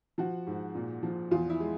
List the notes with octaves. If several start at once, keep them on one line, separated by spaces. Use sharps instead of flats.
F3 F#4
G#2
A#2
F3
E2 F4
E4
G#3